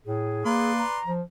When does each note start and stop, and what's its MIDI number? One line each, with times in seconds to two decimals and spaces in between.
0.06 0.42 45
0.06 0.73 68
0.45 0.82 58
0.45 0.99 71
0.45 0.99 74
0.45 0.99 84
0.78 1.11 82
1.06 1.22 53